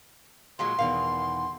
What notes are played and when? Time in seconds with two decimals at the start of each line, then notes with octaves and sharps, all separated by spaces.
0.59 A#2 F#3 G#3 C6
0.79 E2 B2 D#3 F5